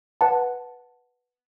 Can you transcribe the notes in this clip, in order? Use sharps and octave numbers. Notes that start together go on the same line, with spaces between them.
B4 F#5 A5